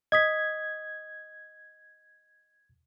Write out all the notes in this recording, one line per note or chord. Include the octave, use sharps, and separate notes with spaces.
D#5 D#6 G#6 B6